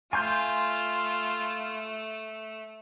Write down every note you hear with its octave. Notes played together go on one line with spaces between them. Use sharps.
A3 F4 G#5 C6 G6